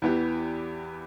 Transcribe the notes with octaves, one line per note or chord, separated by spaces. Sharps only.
E2 E3 B3 G4